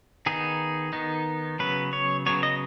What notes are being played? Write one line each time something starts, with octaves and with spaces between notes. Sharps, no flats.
D#3 B3 D#4 G#4
D#3 B3 D#4
C#3 F#3 B3 B4
C#5
C#3 F#3 B3 C#5
D#5